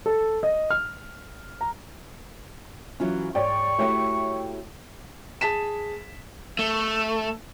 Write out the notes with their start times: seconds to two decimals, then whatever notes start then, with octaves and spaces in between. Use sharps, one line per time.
0.06 A4
0.43 D#5
0.71 F6
1.61 A#5
3.00 E3 F#3 C#4 F4
3.35 G#2 C#5 D5 G5 C#6
3.79 A3 E4 F#4 G4 C#5 G5
5.41 G#4 A5 B6 E7
6.59 A3